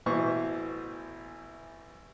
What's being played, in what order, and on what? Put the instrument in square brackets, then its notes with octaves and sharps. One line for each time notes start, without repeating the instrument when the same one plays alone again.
[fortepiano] A1 B2 E3 C5 C#6